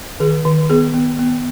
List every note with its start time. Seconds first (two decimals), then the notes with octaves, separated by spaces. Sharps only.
0.20 D#3 G#4
0.45 D#3
0.70 B3 G#4
0.94 B3
1.19 B3